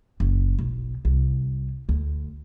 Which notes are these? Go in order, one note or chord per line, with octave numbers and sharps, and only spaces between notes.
F#1
B1
C2
D2